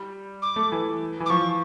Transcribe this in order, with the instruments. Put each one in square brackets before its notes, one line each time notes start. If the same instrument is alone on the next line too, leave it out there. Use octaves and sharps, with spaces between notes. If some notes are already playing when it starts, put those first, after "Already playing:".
Already playing: [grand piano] G3
[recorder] D6
[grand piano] A3
E3
E3
[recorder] D6
[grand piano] F3 [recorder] C#6